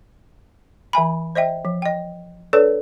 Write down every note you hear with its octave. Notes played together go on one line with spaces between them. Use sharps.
E3 E5 G#5 B5
C5 D#5 E5 G5
F3
D#5 G5
D4 A4 B4 C#5 D5